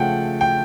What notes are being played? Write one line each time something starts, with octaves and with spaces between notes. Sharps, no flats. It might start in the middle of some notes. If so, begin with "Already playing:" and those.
Already playing: C#3 F3 A3 F#5 G5
G5